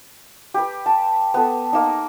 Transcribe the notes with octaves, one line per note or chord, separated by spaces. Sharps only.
G4 B4
A5
B3 A4
A#3 D#4